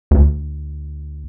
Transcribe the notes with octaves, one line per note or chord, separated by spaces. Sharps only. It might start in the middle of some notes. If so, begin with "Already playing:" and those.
D2